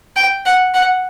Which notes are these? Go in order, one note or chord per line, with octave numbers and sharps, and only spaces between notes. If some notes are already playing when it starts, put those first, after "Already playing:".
G5
F#5
F#5